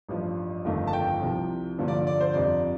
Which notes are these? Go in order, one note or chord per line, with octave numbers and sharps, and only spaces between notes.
A1 G2 F3
G1 F2 D#3 A3 D#4
A5
G5
C2 C3 F3
G2 D3 F3 A#3
D5
D5
C5
G1 F2 C3 D5